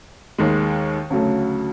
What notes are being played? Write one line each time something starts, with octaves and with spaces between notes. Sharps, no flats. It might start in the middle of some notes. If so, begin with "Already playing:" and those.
D#2 D#3 G#3
D2 C#3 F#3 A3